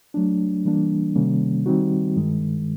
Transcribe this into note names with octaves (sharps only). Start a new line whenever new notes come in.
F#3 A3 D4
E3 G3 A#3 D4
C3 D#3 G3 A#3 C#4
D#3 G3 C4 D#4 F#4
G2 D#3 G#3